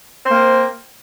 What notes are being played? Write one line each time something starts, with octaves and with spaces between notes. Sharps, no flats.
A#3 C4 C5